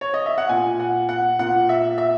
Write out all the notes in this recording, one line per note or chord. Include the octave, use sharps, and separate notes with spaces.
C#5
D#5
E5
F#5
A#2 G#5
F#5
F#5
A#2 F#5
E5
E5